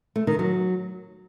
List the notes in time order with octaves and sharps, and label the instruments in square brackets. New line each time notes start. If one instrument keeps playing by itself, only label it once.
[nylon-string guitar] A3
D#3
F#3